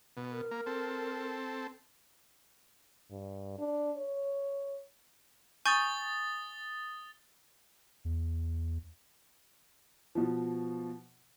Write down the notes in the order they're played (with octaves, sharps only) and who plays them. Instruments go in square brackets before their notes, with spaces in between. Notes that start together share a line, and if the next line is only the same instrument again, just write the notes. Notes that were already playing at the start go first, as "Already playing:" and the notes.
[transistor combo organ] B2
[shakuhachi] A#4
[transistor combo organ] A#3
C4 A4
[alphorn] G2
D4
C#5
[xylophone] G#5 C#6 G6 [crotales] D#6 A6 G7
[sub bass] E2
[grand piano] B2 F3